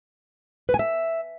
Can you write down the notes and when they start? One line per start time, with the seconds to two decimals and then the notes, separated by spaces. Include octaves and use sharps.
0.69 B4
0.74 G#5
0.79 E5